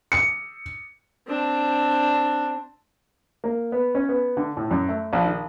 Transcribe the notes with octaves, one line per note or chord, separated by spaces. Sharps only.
C#7
C4 D4
A#3
B3
C#4
B3
D3
A2
F#2
A3
A#1
D#3